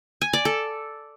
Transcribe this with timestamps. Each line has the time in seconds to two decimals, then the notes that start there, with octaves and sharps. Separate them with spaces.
0.21 G#5
0.33 D5
0.45 A4